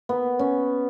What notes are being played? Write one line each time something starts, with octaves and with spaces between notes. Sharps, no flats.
B3
C#4